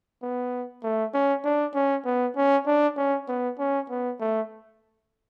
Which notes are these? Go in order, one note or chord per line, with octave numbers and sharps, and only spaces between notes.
B3
A3
C#4
D4
C#4
B3
C#4
D4
C#4
B3
C#4
B3
A3